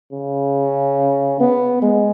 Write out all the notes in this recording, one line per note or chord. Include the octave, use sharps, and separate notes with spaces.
C#3
B3
G#3